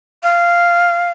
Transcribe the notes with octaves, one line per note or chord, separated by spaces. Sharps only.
F5